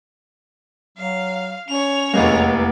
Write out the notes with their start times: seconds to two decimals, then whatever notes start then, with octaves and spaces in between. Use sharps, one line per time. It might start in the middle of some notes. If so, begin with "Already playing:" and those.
0.98 F#3 F5
1.68 C#4 C#5 F7
2.14 F1 E2 G#3 A#3